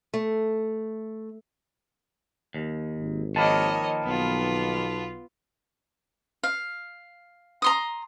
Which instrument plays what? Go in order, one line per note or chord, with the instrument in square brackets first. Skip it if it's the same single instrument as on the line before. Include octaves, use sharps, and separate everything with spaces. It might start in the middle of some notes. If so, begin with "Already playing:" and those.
[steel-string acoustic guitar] A3
[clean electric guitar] D#2
[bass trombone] G#1
[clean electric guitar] D#3 F3 A#3 [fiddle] C#5 D#5 [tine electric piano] A5 B5
[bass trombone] B1 [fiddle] B3 F4
[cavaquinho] F5
A#5 C6 D#6